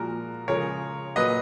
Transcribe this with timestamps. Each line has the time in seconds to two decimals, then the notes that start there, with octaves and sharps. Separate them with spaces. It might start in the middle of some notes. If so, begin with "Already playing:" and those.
Already playing: A#2 F3 G#3 F#4 A#4
0.48 C#3 F3 G#3 A#4 C#5
1.16 A#2 F#3 B4 D#5